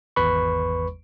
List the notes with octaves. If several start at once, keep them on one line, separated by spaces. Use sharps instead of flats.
G#1 E2 B4 B5 C#6